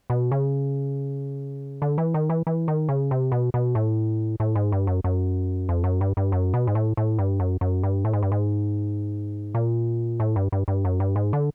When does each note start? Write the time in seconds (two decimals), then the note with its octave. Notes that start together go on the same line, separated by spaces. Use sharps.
0.10 B2
0.32 C#3
1.82 D3
1.98 E3
2.14 D#3
2.30 E3
2.47 E3
2.68 D#3
2.89 C#3
3.11 C3
3.32 B2
3.54 B2
3.75 A2
4.40 A2
4.55 G#2
4.72 G2
4.87 F#2
5.04 F#2
5.69 F2
5.84 F#2
6.01 G2
6.17 G2
6.32 F#2
6.54 B2
6.67 G#2
6.75 A2
6.97 A2
7.19 G2
7.40 F#2
7.61 F#2
7.83 G2
8.05 A2
8.13 G#2
8.22 G2
8.32 G#2
9.55 A#2
10.20 A2
10.36 G2
10.52 G2
10.68 G2
10.85 F#2
11.00 G2
11.16 G#2
11.33 D3